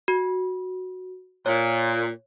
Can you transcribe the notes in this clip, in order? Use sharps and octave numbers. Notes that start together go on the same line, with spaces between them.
F#4
A#2 C#5